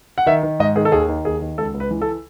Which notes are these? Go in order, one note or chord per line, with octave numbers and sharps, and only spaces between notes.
F#5
D#3 E5
D#3
G#2 D#5
D#3 G#4
A4
D#2 G#4
D#3
D#2 G#4
D#3
C#2 A4
C#2
B4
E3
A4